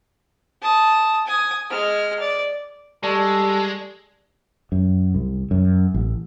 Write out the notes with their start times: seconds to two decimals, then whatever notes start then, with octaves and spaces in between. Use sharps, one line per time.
0.62 A5 D#6
1.26 G#5 D#6
1.70 G#3 F6
2.20 D5
3.03 G3 G#3 A4 D5 A5 C#6
4.72 F#2
5.14 C2
5.51 F#2
5.94 A1